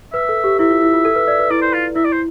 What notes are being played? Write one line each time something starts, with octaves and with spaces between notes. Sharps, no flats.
B4 E5
A4
G4
E4 E5
F4
E4
F4
A4
B4
D5
B4
E4 D5
C5
F4
E4 E5
D5
C5